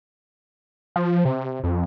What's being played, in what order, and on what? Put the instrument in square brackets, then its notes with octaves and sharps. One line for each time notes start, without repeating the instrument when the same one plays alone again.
[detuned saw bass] F3
C3
F2